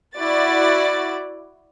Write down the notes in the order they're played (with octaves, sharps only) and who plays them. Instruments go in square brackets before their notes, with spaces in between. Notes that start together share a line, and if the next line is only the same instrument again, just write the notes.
[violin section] E4 F#4 D5 A6